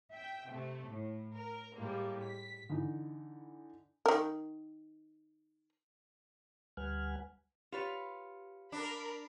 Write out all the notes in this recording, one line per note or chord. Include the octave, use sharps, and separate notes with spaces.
E5 G5
C3 A3
A2
A#4
A2 G3 G#3 A#3
B6
D3 E3 D#4
D#3 A#4
D2 G3 B4 F#5 G#5 F6
F4 G4 B4 C#5
D4 A#4 B5